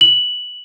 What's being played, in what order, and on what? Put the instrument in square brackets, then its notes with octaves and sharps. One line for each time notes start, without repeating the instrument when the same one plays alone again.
[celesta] F#7